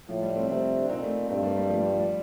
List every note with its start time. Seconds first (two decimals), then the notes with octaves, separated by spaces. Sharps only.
0.09 A2 F3
0.22 G3
0.36 A3 C4
0.49 C3 A3 C4
0.78 D4
0.89 A#2 C4 D#4
1.03 A3 C4
1.29 G2 A3 C4
1.43 G3 A#3
1.56 G3 A#3
1.69 F3 A3
1.80 G3
1.90 F3
1.99 G3